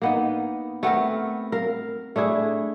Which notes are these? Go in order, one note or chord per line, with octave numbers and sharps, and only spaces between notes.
A#3 B3 D#4
A3 B3 C4 A#4
A#4 F5
A3 D4 E4 G#4